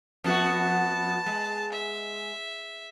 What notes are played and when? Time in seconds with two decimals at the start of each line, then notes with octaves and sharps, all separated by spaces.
0.24 F2 B3 F#4 A5
1.26 G#3
1.72 E5